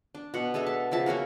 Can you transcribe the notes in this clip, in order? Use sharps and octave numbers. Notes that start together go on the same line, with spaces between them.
D4
B2 F#5
G#3 D4 A4 E5
A5
C#3 F3 E5 A5
A#3 C#4 F#4 A#4